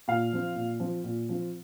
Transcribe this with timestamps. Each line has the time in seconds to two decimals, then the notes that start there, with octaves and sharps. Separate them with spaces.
0.08 A#2 F5
0.33 F3 C4
0.56 A#2
0.80 F3 C4
1.04 A#2
1.29 F3 C4